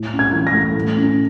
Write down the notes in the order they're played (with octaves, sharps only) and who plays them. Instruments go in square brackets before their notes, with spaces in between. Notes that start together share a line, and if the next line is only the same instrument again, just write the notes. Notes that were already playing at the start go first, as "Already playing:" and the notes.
Already playing: [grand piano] A2
C#4
G#6
E3
A#6
A3
A2
C#4